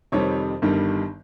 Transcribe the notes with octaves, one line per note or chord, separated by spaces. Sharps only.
F2 C3 D#3 G3 C#5
G1 G2 D#3 G3